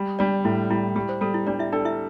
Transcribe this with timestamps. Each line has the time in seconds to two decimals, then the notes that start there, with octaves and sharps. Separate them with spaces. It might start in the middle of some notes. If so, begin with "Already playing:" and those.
Already playing: G3
0.19 G3 D4 D5
0.45 A2 E4
0.70 G3 E4
0.95 G3 G4
1.09 C5
1.21 G3 A4
1.34 E4
1.47 G3 D4 D5
1.59 E4 E5
1.72 D4 A4 D5
1.85 E4 E5